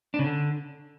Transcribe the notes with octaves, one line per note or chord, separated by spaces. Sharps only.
D4
C#3
D3